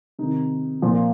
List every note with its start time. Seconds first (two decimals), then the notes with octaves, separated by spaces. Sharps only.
0.19 C3 D#3 D#4
0.82 A#2 F3